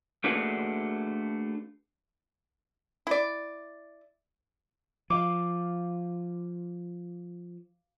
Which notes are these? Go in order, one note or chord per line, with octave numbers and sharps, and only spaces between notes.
A3 A#3 D4 F#4 G#4 B4
E4 D5
F3 F5 D6